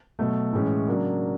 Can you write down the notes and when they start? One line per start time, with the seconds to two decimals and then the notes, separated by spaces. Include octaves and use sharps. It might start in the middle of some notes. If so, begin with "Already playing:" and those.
0.19 B2 F#3 A3
0.53 A2 E3 G#3 C#4
0.88 C#3 F#3 A#3 D4